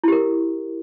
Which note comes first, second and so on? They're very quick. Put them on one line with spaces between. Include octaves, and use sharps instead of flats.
E4 G4 A#4